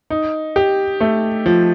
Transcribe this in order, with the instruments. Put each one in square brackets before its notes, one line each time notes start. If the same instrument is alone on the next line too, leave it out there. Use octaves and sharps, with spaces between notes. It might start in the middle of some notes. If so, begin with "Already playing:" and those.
[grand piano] D#4
G4
A3
F3